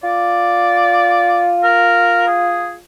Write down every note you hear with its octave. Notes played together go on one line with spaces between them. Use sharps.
F4 D5
A#4
G#4